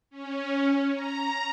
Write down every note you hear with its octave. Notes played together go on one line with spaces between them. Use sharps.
C#4
A#5